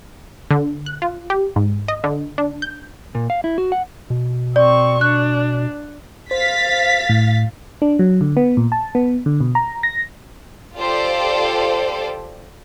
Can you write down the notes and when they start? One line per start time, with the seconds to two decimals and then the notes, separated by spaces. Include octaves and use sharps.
0.51 D3
0.86 F#6
1.02 F4
1.30 G4
1.56 G#2
1.88 D#5
2.04 D3
2.38 D4
2.62 G6
3.15 A#2
3.30 F5
3.44 E4
3.58 F#4
3.72 F#5
4.10 B2
4.56 C4 D5 C#6
5.01 D4 F#6
6.31 C5 F5 A6 B6
7.09 A2
7.82 D4
7.99 F#3
8.21 D3
8.37 B3
8.57 A#2
8.72 A5
8.95 B3
9.26 D3
9.41 B2
9.55 A#5
9.83 A#6
10.77 F4 G4 A4 C5 D5